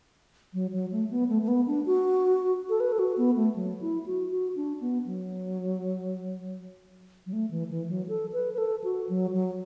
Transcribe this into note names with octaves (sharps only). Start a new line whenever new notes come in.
F#3
F#3
A3
B3
A3
A3
B3
D4
F#4
A4
B4
A4
F#4
B3
A3
F#3
E4
F#4
F#4
D4
B3
F#3
F#3
A3
E3
E3
F#3
A4
B4
B4
A4
F#4
F#3
F#3